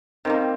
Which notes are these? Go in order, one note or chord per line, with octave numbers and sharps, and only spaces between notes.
D#3 G3 A#3 C4